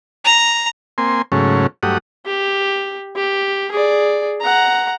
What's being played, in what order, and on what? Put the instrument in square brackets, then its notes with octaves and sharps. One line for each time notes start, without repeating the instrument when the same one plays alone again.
[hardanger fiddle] A#5
[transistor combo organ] A#3 C4 G#5 C6
G#2 C#3 F#3 A3 C#4
G2 F#3 A3 G4 F#5 D#6
[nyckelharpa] G4
G4
G#4 D5
F#5 A#5